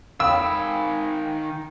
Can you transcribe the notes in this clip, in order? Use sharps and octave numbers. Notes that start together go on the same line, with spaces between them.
D#3 F5 G5 B5 D#6 E6